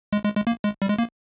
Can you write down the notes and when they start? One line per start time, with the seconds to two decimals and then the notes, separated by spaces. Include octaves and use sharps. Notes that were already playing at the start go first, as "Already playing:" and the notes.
0.13 G#3
0.24 G#3
0.36 G#3
0.47 A#3
0.64 G#3
0.82 G3
0.89 G#3
0.99 A#3